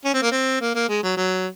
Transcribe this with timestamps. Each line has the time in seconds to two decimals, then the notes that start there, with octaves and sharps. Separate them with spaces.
0.05 C#4
0.14 C4
0.22 A#3
0.32 C4
0.61 A#3
0.75 A#3
0.89 G#3
1.03 F#3
1.17 F#3